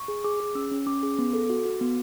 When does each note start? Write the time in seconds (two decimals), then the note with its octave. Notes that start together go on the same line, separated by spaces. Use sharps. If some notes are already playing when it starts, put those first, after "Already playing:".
Already playing: C#6
0.08 G#4
0.24 G#4 D6
0.40 G#4
0.55 C#4 E6
0.71 C#4
0.87 C#4 D6
1.03 G#4
1.19 B3
1.34 A4
1.50 F#4
1.65 F#4
1.81 B3